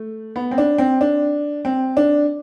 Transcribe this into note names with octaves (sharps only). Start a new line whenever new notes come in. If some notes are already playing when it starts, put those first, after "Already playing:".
Already playing: A3
B3
C4
D4
C4
D4
C4
D4